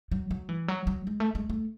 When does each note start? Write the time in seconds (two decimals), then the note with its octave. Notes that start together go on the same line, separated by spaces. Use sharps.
0.11 F#3
0.31 F#3
0.49 E3
0.68 F#3
0.87 F#3
1.07 G#3
1.20 A3
1.35 G#3
1.50 A3